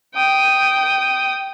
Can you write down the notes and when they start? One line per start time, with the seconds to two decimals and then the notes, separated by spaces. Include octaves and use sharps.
0.15 G5 D#6